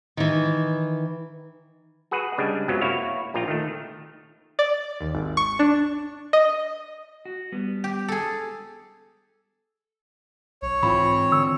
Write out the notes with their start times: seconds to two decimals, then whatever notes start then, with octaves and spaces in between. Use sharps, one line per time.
0.17 D#3 E3
2.11 F#4 G#4 B4 F#5
2.38 C#3 G3 G#3 D4
2.68 F#2 C3 F#3 B3 C#4 F4
2.81 A#3 E4 F#4 C#5 F5
3.34 A#1 A#2 F4 G5 A#5
3.48 D#3 A3
4.59 D5
5.01 D#2
5.15 G#1
5.37 C#6
5.59 D4
6.33 D#5
7.25 F#4
7.52 G3 B3
7.84 G4
8.08 G#4 A4
10.62 B1 C#5
10.83 G#2 E3 C4 F4 B5
11.32 D3 E6